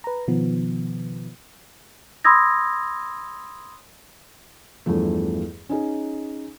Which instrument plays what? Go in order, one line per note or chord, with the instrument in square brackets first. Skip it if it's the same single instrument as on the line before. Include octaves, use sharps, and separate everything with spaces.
[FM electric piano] B4 A#5
B2 D#3 F3 B3
[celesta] B5 C6 D#6 E6 G#6 A#6
[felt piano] E2 G2 F3 A3
C#4 D#4 G#4